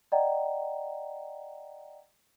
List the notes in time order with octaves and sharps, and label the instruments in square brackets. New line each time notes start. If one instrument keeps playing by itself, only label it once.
[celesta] D5 D#5 F#5 G5 A#5